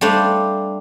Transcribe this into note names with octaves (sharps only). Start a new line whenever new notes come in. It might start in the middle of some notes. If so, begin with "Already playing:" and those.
G3 A3 D4 C5 F5